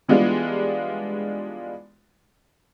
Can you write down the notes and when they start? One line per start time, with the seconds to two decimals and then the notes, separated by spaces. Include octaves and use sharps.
0.08 E3 G3 G#3 B3 D4 F4